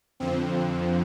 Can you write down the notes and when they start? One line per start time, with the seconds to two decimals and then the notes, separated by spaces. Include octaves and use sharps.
0.20 F2 D3 F3 C4